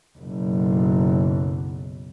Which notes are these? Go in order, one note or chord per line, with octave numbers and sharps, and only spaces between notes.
F#1 B1